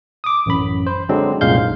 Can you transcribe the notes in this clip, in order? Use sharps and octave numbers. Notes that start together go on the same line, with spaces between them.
D6 D#6
A1 F#2 B5
C5
D3 F#3 G#3 C4 D4
C2 F#2 A#2 G#3 F5 G6
B1